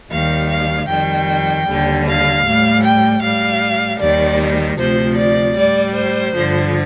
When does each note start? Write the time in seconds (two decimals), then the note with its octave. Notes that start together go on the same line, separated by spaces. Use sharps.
0.11 D#2 D#3 G3 F5
0.49 F5
0.88 F2 D#3 G3 G5
1.66 D#2 D3 G3
2.06 F5
2.45 A2 G3
2.83 G5
3.22 A2 G3 F5
4.00 D#2 D#3 G3 D5
4.78 D2 C3 F3 C5
5.17 D5
5.56 A2 G3 D5
5.95 C5
6.34 G2 D3 F3